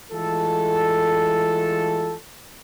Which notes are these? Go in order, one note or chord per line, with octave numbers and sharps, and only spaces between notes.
E3 G#3 A3 F4 A4